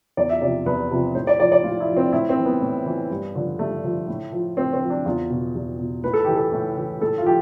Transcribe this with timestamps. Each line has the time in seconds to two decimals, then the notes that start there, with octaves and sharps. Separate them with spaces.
0.17 E2 D5
0.29 E5
0.41 C3 F3 D5
0.66 E2 B4
0.91 C3 F3
1.15 A2 C5
1.27 D5
1.39 F3 D5
1.52 D5
1.64 A2 F4
1.80 E4
1.88 F3
1.97 C4
2.12 A2 E4
2.29 C4
2.37 E3
2.45 B3
2.61 A2
2.86 E3
3.10 G2
3.35 D3 F3
3.59 G2 A3
3.84 D3 F3
4.08 A2
4.33 F3
4.57 A2 C4
4.73 C4
4.81 F3
4.90 D4
5.05 E2 F4
5.30 B2
5.55 E2
5.79 B2
6.03 A2 B4
6.14 A4
6.24 E3 G4
6.36 A4
6.52 A2
6.77 E3
7.01 A2 A4
7.18 F4
7.25 F3 G4